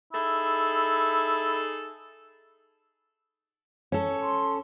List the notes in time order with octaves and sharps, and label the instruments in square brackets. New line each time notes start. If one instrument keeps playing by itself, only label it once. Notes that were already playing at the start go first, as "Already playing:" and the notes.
[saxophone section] D#4 G#4 A4 [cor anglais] E4
[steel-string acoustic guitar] C#4 A4
[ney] C6